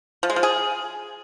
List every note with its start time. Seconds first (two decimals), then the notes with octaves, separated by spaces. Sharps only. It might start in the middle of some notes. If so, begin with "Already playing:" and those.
0.23 F3
0.30 G#3
0.36 F3
0.43 G#4